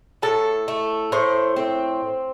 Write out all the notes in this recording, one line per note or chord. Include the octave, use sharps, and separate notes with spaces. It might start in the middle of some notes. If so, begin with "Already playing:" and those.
A2 A4
A3
A2 C5
C4